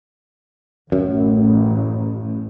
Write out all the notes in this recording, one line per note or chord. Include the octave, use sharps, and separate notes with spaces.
A1 F#2